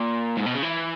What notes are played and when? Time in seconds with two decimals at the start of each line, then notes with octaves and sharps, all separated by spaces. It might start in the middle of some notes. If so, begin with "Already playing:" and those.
Already playing: A#2
0.37 G#2
0.46 B2
0.54 C#3
0.63 E3